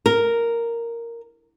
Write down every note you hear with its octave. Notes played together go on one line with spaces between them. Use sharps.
A#4